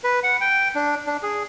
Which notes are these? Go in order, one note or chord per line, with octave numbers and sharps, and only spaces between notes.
B4
F#5
G5
D4
D4
G#4